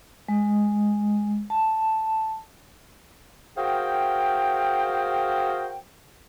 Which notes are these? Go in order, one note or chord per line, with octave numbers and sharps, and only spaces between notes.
G#3
A5
F#4 G#4 A#4 C5 F5 G5